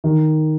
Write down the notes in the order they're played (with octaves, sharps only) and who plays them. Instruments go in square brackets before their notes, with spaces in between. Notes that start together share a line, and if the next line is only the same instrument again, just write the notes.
[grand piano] D#3